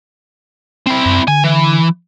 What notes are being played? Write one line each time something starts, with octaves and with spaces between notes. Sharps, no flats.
C4 E4
F#2
D3 G#5
E3